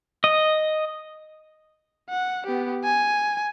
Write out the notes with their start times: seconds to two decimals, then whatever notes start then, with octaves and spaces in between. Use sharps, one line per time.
0.24 D#5
2.10 F#5
2.46 B3 G4
2.84 G#5